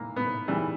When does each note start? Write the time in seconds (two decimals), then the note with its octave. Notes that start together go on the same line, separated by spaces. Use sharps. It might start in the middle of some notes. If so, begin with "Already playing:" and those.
Already playing: E3 A#3
0.16 B3
0.48 C#3 E3 G3